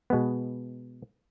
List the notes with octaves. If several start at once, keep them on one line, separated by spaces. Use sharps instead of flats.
B2 G#3 B3